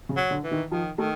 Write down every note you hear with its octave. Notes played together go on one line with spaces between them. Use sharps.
C#3
F#3
D3
E3
D#3
D#3 F3
D#3 A3